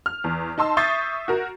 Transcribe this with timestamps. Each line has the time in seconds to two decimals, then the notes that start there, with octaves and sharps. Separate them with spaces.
0.06 F6
0.24 E2
0.58 D#4 A5 C6 E6
0.77 E5 C#6 D#6 G6 A6 C7
1.28 F#4 A#4